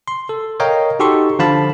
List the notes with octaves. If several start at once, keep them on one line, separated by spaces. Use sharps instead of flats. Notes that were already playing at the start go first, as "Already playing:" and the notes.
C6
A4
A#4 C#5 D#5 F5 G5 A#5
D#4 F#4 G4 A4 C6 C#6
D3 F3 F4 F5 A5 B5